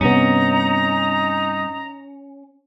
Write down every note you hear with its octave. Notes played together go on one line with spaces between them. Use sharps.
G2 C3 B3 C#4 D#4 A#5